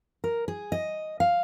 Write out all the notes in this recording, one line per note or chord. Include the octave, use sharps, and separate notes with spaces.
A#4
G#4
D#5
F5